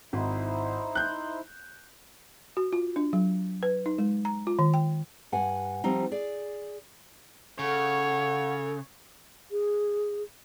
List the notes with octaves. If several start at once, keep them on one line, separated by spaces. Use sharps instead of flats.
G#1 D#4 E4 C5
F#6 G6
F#4
F4
D4
F#3
B4
D#4
G#3
A#5
F4
D#3
G5
G2 F#5 G#5
F3 G3 C4 D#4
G#4 D5
C#3 A4 C#5 F#5
G#4